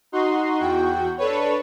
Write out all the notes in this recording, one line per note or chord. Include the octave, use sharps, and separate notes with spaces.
D#4 F#4 C6
E2 F#4 G5
D4 A4 B4 C#5